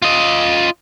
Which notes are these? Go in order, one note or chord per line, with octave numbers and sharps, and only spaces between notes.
F4 D#5